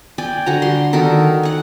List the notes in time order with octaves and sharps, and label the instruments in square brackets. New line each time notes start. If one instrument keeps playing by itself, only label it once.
[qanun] D5 G5 G#5
D3 F#4 A#5
G3 C6
D#3 F#4 A4 A#4
F#5 G#5